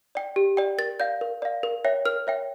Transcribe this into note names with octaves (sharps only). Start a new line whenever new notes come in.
D5 G5
G4
D5 G5
A#4 A6
D5 F5 G6
A#4
D5 F5
A#4
C#5 E5 G5
A#4 F6
C#5 E5 G5